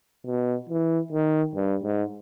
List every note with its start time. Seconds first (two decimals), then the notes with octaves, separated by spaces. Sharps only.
0.27 B2
0.69 E3
1.12 D#3
1.55 G2
1.83 G#2